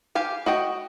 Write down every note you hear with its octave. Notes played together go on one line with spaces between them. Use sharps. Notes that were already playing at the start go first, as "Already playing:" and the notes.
G4 F5 G#5
F#4 D#5 G5